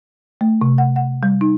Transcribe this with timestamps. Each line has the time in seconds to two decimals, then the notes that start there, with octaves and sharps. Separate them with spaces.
0.41 A3
0.61 C3
0.78 F#5
0.96 F#5
1.23 G3
1.41 D#4